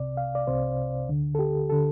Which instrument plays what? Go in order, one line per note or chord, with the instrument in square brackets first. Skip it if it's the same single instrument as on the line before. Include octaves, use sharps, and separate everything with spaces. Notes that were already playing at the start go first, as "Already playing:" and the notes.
Already playing: [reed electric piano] C2 C3 D5
F5
D5
C2 C3 C5
D2 D3
A4
G4
D3 A4